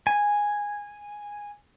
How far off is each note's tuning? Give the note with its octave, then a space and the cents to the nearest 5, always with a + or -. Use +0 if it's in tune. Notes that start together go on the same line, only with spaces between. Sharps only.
G#5 -5